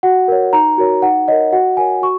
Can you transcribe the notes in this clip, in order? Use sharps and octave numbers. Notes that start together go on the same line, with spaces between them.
F#4 F#5
A#4 C#5
D#4 A#5
F#4 A#4 C#5
D#4 F#5
A#4 C#5 D#5
F#4 F#5
A#4 C#5 G#5
F#4 C#6